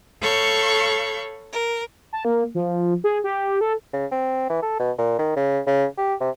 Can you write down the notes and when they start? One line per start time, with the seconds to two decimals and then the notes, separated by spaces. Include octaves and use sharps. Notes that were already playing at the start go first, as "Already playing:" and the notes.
0.21 A4 C#5 F5 B5 C#6 G6
1.52 A#4
2.13 A5
2.25 A#3
2.55 F3
3.04 G#4
3.24 G4
3.61 A4
3.93 C#3
4.11 C4
4.50 E3
4.62 A4
4.80 B2
4.98 A#2
5.19 D#3
5.36 C#3
5.67 C#3
5.98 G4
6.20 C3